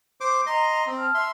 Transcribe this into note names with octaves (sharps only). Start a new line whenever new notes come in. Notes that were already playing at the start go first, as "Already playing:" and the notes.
C5 D6
D#5 A#5 C6
C4
A5 F6
E5 C6